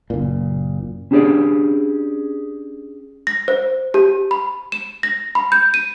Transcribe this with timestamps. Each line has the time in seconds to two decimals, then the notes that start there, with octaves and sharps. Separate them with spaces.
0.10 F#1 A#2
1.11 C#4 D4 G4 G#4 C#5 D5
3.27 A#6
3.48 C5
3.94 G4
4.31 B5
4.72 E7
5.03 A#6
5.35 B5
5.52 G6
5.74 D#7